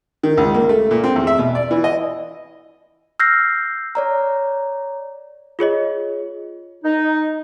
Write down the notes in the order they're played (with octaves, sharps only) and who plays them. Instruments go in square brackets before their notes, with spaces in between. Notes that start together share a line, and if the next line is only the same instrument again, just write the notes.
[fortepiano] D#3
C#2
A#3
A3
A#2
C4
E2
E5
B2
D5
E3
D#5
[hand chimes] E6 F6 G6 A#6 C7
C#5 D5 A#5
[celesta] F4 G#4 C#5 D#5
[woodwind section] D#4